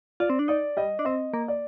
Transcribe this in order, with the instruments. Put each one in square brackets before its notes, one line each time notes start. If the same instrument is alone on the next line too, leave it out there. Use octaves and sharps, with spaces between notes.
[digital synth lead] F4 [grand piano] D5
[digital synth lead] C4
D4
[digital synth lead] D#4 [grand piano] D5
[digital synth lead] G3 [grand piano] D#5
[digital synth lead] D4
[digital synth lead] C4 [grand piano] D#5
[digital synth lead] A#3
[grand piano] D5